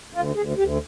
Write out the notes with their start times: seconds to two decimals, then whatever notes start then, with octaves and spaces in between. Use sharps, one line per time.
0.13 D2 F4
0.35 D2 G#4
0.57 D2 G4